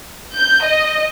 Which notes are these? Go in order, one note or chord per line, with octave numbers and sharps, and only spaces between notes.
G6
D#5